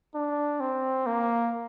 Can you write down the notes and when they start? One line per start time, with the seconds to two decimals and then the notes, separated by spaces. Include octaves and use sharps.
0.15 D4
0.60 C4
1.07 A#3